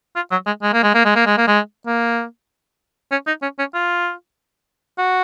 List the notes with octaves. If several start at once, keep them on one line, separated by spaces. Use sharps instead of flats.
F4
F#3
G#3
G#3
A#3
G#3
A#3
G#3
A#3
G#3
A#3
G#3
A#3
C#4
D#4
C#4
C#4
F4
F#4